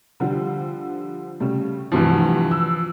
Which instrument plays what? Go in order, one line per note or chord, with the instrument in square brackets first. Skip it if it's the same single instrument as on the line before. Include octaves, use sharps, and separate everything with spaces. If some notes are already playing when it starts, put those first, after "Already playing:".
[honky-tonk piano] D3 F3 G3
C#3 G3 A3
[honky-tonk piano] D2 G2 C3 [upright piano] E3 F3
[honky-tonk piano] E6